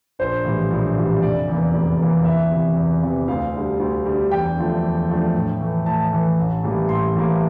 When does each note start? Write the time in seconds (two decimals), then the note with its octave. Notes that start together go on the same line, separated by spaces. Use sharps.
0.19 A#1 C5
0.44 A2 E3 G3
0.70 A#1
0.97 A2 E3 G3
1.22 F1 D5
1.48 E2 E3 A#3
1.73 F1
1.99 E2 E3 A#3
2.24 E2 E5
2.51 C3 E3
2.76 E2
3.02 C3 E3
3.28 D2 F5
3.54 D3 G3
3.80 D2
4.06 D3 G3
4.31 E2 G5
4.57 D3 F3 A3 D4
4.83 E2
5.09 D3 F3 A3 D4
5.34 A2
5.60 E3 A3
5.86 A2 A5
6.11 E3 A3
6.38 A1
6.63 A2 E3 G3 A#3
6.89 A1 C6
7.15 A2 E3 G3 A#3